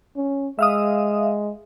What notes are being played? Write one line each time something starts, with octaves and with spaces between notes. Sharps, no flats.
C#4
G#3 E5 F5 D#6